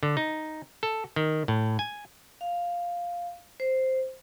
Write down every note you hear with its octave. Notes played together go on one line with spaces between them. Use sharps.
D3
D#4
A4
D#3
A2
G#5
F5
C5